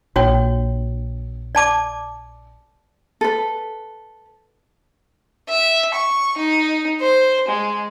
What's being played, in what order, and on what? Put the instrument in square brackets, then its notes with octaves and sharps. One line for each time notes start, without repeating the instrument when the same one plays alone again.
[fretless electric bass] A#1 [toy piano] F#4 C#5 G5
[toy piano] D5 A5 D6
[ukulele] A4 B4
[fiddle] E5
C#6
D#4
C5
G#3